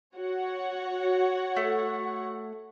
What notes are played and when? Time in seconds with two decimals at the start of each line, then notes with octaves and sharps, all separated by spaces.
0.16 F#4 C#5 F#5
1.56 A3